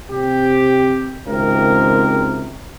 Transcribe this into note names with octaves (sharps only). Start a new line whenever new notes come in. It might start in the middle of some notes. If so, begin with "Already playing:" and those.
C3 G4
G#1 C#2 C3 C4 A#4